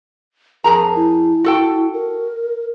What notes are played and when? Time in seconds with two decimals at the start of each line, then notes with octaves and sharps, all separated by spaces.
0.64 F2 G#4 A#4 A#5
0.96 E4
1.44 F#4 A4 G5
1.93 A#4